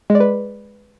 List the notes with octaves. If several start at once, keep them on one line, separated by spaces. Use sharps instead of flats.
G#3
D5
B4